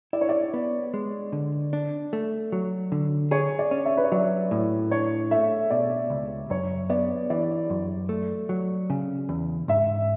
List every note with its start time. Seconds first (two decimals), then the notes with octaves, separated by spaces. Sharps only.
0.13 E4 D5
0.21 C#5
0.29 D5
0.54 B3
0.94 G#3
1.32 D3
1.73 D4
2.13 A3
2.52 F#3
2.92 D3
3.31 G#4 C#5
3.59 D5
3.71 C#4
3.86 E5
3.97 B4
4.04 C#5
4.12 F#3 D5
4.51 A2
4.91 D4 C#5
5.31 A3 E5
5.70 B2 D5
6.10 C#2
6.50 F#2 C#5
6.90 B3 D5
7.30 E3 D5
7.70 F#2
8.09 A3
8.49 F#3
8.90 C#3
9.29 E2
9.68 G#2 E5